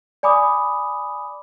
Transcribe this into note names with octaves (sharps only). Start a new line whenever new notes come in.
D5 G#5 B5 D6 D#6